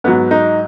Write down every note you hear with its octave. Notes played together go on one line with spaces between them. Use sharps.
G#2 F#3 B3
D#4